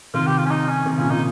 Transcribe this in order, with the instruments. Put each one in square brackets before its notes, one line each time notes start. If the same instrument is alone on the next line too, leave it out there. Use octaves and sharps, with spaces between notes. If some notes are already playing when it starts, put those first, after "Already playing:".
[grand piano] C3 D#3 [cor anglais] F4
[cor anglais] G4
F4
C#4
D#4
C#4
[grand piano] C3 D#3
[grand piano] A#2 C#3 [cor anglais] C#4
[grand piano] A#2 C#3 [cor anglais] D#4